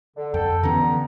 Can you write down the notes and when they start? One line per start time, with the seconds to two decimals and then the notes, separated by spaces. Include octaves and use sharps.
0.17 D3
0.34 F2 A4 G5
0.63 G2 D3 E3 B3 C#4 A#5